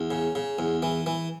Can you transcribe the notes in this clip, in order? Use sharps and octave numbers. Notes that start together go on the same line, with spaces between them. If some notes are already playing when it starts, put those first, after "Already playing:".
Already playing: E2
C#3
C#3
E2
E3
E3